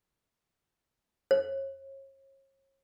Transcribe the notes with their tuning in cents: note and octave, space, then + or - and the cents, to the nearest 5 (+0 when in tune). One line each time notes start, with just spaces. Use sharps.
C#5 -35